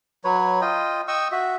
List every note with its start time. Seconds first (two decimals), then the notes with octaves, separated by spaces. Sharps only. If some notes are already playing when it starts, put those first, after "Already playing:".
0.24 F#3 B4 C#5
0.61 F4 D#5 G5
1.08 D#5 G5 C#6 E6
1.32 F#4 E5